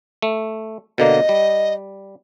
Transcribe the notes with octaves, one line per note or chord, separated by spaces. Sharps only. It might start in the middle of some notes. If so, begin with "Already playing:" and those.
A3
B2 D3 A#3 D#5
G3